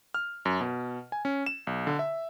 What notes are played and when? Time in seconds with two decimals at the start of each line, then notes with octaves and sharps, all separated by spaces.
0.14 F6
0.45 F#2
0.61 B2
1.12 G#5
1.25 C#4
1.46 E7
1.67 B1
1.87 D3
1.99 E5